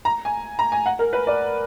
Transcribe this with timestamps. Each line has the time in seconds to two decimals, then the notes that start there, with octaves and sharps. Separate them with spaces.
0.05 A#5
0.25 G#5
0.59 A#5
0.72 G#5
0.86 F#5
0.99 A#4
1.13 B4
1.27 D5